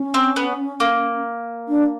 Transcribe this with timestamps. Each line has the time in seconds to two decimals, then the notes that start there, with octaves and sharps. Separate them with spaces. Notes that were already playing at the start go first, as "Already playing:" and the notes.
Already playing: C#4
0.14 C4
0.36 B3
0.80 A#3
1.68 D4